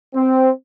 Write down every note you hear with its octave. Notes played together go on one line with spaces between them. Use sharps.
C4